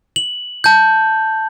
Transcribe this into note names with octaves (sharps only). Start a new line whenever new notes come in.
F#7
A5 G6